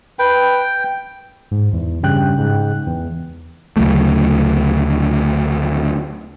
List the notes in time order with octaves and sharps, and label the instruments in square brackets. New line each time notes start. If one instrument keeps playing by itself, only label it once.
[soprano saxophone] B4 [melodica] G5
[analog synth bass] G#2
E2
[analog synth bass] G2 [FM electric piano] C#3 G5 F#6
[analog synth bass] G#2
E2
[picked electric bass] D2 C#3 F#3 A3